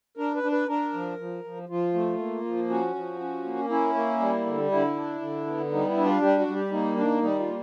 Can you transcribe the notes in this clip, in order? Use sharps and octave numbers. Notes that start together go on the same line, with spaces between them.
D4 A#4
B4
D4
B4
D4 A#4
F3
F3
F3
F3 F4
A3
A#3
F3
C#4 F#4
F3
C#4
A#3
C#4 E4
A#3
G3
D3
D3 E4
D4
D3
B3
G3 D#4
E4
D4
F4
G3 G4
F#4
G3
G4
A#3 D#4
D#3 D4
G3 D#4
F4
A#3